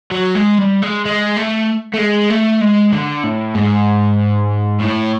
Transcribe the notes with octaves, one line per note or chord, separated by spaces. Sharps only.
F#3
G#3
G3
G#3
G#3
A3
A3
G#3
A3
G#3
D3
A2
G#2
A2